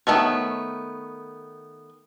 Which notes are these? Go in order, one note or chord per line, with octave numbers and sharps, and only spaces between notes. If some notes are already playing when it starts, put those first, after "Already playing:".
D#3 A3 B3 C#5